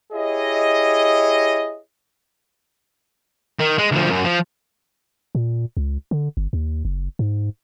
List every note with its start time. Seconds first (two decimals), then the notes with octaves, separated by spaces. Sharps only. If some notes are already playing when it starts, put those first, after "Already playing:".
0.13 E4 G4 G#4 C#5 D#5
3.59 D#3
3.79 G#3
3.92 D2 F3
4.10 F#2
4.25 F3
5.35 A#2
5.77 C#2
6.11 D3
6.37 G1
6.53 D#2
6.85 F#1
7.19 G#2